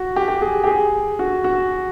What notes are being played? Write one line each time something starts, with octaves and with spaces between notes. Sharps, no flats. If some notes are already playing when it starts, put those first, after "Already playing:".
Already playing: F#4
G4
G4
G#4
G4
G#4
F#4
F#4